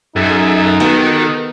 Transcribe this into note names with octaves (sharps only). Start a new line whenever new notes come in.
F#2 D#4 G#4 A4 E5
D#3 B3 F#4 G4 A4